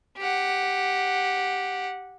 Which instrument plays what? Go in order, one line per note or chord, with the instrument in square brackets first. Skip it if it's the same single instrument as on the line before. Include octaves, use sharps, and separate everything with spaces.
[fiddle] G4 F#5